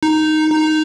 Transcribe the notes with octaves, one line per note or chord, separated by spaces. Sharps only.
D#4
D#4